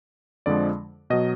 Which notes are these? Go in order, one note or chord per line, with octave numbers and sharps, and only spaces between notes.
F2 D3 F3 G#3 D5
B2 F#3 D#5